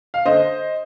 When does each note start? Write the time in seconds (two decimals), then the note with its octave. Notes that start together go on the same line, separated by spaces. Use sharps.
0.14 F5
0.26 D3 C5 D#5